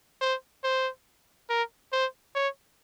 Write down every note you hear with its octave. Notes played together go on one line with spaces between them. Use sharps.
C5
C5
A#4
C5
C#5